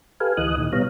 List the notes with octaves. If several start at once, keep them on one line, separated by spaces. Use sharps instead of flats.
G4 A4 B4 F5 G#5
D2 E3 D#5 D#6 F#6
A#2 D#3
B2 G3 B3 C#5 F5 A#5